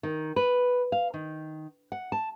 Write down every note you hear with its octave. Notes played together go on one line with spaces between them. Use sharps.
D#3
B4
F5
D#3
F#5
A5